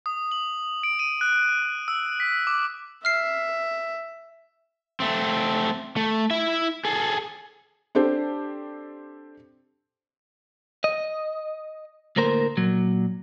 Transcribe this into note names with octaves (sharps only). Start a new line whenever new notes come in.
D#6
F#7
D7
D#7
F#6
E6
B6
D6
E5 F6 C7
A3 C4
A3
E4 E5
G#4 A4
C4 D4 G4 A4 C5
D#5
D2 A2 A#3 A#4 C5
A#2 F#3